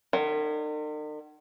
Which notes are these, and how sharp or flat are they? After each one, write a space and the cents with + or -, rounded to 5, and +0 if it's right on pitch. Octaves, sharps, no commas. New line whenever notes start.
D#3 -45